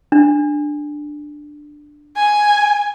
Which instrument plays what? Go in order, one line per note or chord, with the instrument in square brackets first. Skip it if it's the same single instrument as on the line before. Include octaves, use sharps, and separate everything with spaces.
[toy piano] D4
[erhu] G#5